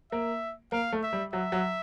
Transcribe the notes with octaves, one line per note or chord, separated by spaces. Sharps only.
A#3 E5
A#3 F5
A3
E5
G3
F#3 E5
F#3